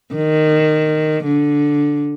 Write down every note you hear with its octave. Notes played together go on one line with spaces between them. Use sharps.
D#3
D3